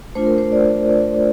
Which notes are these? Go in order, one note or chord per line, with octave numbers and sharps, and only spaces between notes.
A3 D4 F4 C5
A#4
C5
D5
D5